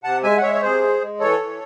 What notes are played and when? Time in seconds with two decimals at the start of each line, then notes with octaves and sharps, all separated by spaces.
0.04 C3 F#5 A5
0.23 G#3 E5 G#5
0.37 F#5
0.42 G#3 C#5 E5
0.54 C#5
0.62 C3 G#4 C5
0.81 G#3
1.01 G#3
1.20 E3 A4 C#5
1.39 E3